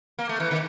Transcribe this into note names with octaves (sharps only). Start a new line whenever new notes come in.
A#3
A3
E3
D#3